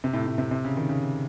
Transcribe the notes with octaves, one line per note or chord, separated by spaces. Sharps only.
C3
A2
A2
C3
C3
C#3
D#3
C#3